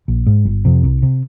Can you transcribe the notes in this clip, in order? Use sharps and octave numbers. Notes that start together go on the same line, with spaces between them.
A#1
G#2
G1
F2 C3
C2
C3